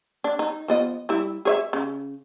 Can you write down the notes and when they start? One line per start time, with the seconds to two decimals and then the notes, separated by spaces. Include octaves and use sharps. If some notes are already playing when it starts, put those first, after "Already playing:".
0.24 D4
0.39 D#4
0.68 F3 B3 D#5
1.09 G3 E4
1.45 G#4 C#5 E5
1.73 C#3